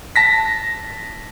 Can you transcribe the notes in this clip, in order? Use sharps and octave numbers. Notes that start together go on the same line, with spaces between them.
A5 A#6 B6